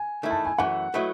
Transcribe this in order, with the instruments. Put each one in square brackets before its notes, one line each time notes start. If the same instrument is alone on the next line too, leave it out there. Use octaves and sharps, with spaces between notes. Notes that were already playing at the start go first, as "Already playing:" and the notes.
Already playing: [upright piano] G#5
[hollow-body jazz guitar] D#3 A3 E4
[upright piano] A5
G#5
[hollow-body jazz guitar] F#2 E3 A3 [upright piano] F#5
[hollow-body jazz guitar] F#3 A3 E4 B4 D#5